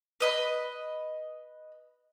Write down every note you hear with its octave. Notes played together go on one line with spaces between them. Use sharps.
B4 D#5 B5